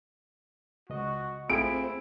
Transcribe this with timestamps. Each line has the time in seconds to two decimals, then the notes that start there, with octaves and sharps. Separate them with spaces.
0.90 C#2 F#4 D#5
1.50 A3 C4 E4 F4 G#4 D7